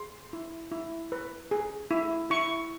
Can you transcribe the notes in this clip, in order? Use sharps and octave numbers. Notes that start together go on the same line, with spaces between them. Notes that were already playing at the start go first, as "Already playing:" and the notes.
Already playing: G#4 C6
E4
E4
B4
G#4
E4
E4 C#6